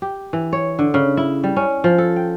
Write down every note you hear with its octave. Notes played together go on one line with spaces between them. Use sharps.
G4
E3
C#5
D3
C#3
E4
G3
C#4
F3
A4
G5